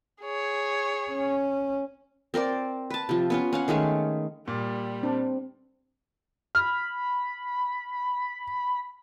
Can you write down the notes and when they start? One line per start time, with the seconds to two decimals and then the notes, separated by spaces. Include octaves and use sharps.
0.22 G#4 C#5
1.12 C#4
2.34 C4 A#4 C5 D5
2.90 B4 A5
3.09 C3 F3
3.30 B3 C#4 F4
3.53 C#4 F5 F#5
3.68 D#3 G#3 A3 C#4
4.48 A#2 G3
5.03 C4 D4
6.55 B5 F6